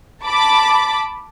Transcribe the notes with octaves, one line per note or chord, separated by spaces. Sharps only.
A5 B5 D6